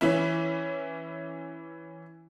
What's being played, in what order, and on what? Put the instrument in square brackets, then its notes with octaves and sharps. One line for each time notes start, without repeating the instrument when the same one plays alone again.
[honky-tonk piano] E3 C#4 E4